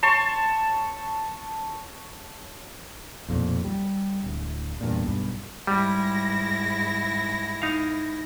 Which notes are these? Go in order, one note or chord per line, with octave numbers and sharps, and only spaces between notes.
C#5 A5 C6 C#6
B1 F2 A#2
G3
D1
E2 G2 A#2
B1 G2
G#2 G3 E4 A#6
D#4 F5